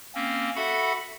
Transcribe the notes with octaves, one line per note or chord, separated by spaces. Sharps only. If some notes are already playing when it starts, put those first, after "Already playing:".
A#3 C4 C#4
F#4 A4 E5 F#5 B5